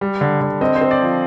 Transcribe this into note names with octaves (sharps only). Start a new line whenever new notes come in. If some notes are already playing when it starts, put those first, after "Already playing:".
G3
D3
D3
C4 D#5
C5
C4
D5
F3